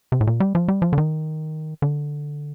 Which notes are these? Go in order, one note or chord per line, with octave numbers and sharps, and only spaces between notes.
C3
A2
A#2
G3
F3
G3
F3
D3
D#3
D3